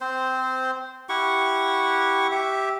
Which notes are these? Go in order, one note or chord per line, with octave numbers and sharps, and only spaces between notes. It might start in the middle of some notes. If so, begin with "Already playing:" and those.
C4 C5
E4 G4 F#5 C#6
G4 E5